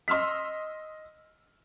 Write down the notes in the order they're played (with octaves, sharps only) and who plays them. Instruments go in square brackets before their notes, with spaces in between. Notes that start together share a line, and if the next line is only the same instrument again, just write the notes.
[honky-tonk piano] D#5 C6 E6 F6 B6